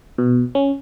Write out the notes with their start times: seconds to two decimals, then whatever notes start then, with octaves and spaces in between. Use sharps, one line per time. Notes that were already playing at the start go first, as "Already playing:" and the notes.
0.18 B2
0.55 C#4